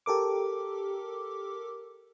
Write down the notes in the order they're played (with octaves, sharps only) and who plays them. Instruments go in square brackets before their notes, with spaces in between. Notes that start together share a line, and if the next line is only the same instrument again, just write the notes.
[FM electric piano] G4 A4 A#4 D6